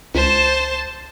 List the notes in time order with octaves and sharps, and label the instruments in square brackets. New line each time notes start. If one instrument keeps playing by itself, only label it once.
[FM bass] C#2 [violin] C5 A5